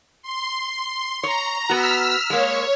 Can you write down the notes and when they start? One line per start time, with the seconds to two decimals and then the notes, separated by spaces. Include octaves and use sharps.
0.22 C6
1.23 C#5 A#5
1.69 B3 F#4 E6 F6 B6
2.30 G#3 A#3 C#5